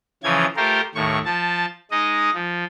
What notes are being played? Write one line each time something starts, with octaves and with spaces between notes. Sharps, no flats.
C#3 E3 F3 G#6
A3 F4 G4 A#4 C5
D#2 A2 C#6
F3 A5
G#3 D#4 D#5
F3